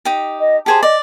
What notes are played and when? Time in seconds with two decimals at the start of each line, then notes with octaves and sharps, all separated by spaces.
0.05 D#4 G4
0.40 D#5
0.66 G4 G#4 C5 A5
0.83 D5 D#5